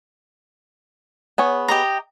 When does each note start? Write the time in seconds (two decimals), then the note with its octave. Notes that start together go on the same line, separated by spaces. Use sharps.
1.38 B3 G#4 C#5
1.68 G4 D#5 A#5